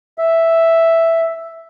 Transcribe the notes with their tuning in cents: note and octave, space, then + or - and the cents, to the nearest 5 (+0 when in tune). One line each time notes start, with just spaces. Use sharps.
E5 +0